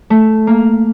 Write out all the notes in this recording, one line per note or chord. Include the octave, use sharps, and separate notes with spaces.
A3
A#3